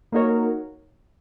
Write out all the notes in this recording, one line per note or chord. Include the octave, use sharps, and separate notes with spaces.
A#3 D#4 F#4 A#4 C#5